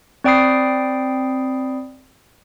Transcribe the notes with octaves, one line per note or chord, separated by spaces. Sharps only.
C4 D5 G5 B5 D#6 C7